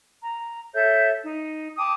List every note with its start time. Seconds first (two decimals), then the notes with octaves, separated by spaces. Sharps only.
0.22 A#5
0.75 A4 C#5 E5 G6
1.22 D#4
1.78 G5 A5 D6 D#6